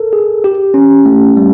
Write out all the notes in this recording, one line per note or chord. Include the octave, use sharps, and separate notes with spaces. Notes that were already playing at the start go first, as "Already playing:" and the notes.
Already playing: A4 A#4
G#4
G4
C#4
A3
G3